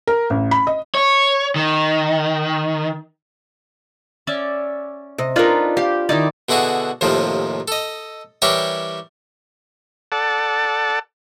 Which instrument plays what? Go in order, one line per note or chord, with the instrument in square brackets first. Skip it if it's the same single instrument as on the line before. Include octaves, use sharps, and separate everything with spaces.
[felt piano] A#4
A1
B5
D#5
[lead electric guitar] C#5
D#3
[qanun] C#4 D5 E5
[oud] C3 D#5
[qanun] D4 F4 B4 [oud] D#4 A#4
[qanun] G4 [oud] F5
[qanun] D#3 E4 D5 [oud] D#4
[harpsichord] B2 D3 E4 F#4 G#4
D#2 A2 C3 D#3 F3
A4 D#5
E3 G3 E4 G4 A#4 C#5
[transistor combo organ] A4 D5 F#5 A5